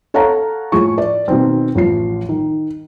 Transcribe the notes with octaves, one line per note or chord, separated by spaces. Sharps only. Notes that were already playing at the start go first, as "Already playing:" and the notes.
A4 C#5 F5 F#5 A5 A#5
A2 F3 G#4 C#6
D5
B2 D#3 C4
A1 F3 C7
D#3